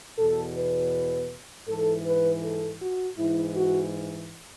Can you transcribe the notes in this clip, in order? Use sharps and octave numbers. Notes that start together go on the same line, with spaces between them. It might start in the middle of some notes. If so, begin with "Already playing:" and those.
E2 B2 A4
B4
G#2 E3 A4
B4
A4
F#4
G#2 E3 E4
F#4